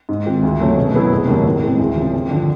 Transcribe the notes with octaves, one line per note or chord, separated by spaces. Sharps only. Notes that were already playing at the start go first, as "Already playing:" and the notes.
G#2
D#3 G#3 C4 F4
D2
C#3 F#3 A3 C#4
B2
F#3 B3 E4 G#4
F1
D#2 C#3 F#3
A2
E3 G#3 C4
D2
C#3 F3
F2
D3 F3